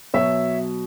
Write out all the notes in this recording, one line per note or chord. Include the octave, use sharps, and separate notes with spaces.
B2 F#3 C#5 E5